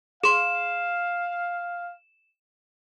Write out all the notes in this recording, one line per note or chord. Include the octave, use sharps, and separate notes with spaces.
G#4 F5 C6 E7